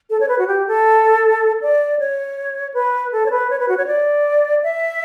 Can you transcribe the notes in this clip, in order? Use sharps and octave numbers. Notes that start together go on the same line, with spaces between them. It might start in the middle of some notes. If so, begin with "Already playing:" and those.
A4
C#5
B4
F#4
G4
A4
D5
C#5
B4
A4
C#5
B4
C#5
B4
F#4
C#5
D5
E5